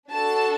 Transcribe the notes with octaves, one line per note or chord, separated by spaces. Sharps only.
D4 F#4 A4 A5